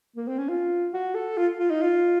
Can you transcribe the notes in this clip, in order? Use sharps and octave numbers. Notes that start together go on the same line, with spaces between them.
A#3
C4
C#4
F4
F#4
A4
F4
F4
D#4
F4